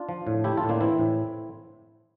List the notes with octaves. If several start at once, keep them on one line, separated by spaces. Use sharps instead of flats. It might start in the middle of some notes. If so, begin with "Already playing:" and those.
Already playing: D4 F4
F3
A2
A3 E4 G4
F4 A4
A2
A#3 D4
E3 C4 E4
A2